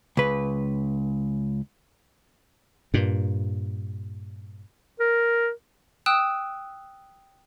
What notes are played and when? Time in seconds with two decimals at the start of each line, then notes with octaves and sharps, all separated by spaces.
0.17 C#2 B4
2.94 G2 A#2
5.00 A#4
6.06 G5 D#6 E6 F#6 E7